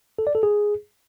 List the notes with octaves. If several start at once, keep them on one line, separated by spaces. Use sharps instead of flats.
A4
D5
A4
G#4